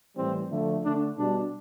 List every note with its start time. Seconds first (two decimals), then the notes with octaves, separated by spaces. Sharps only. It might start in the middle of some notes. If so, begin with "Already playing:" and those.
0.15 A2 E3 G3 C4
0.49 D3 F3 A3
0.83 D3 A3 D4
1.16 B2 G3 D4